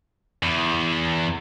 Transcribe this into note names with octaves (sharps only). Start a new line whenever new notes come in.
E2